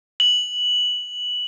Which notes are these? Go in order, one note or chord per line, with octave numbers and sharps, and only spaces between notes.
F#7